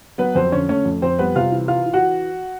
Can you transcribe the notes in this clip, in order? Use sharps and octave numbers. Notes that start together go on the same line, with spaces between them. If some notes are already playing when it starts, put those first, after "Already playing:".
F#3 B3 B4
F2 C4 C5
D3 C#4 C#5
A3 C#4 C#5
F2
F2 C4 C5
G3 B3 B4
C3 F4 F5
E3
E3 F4 F5
E3
F#4 F#5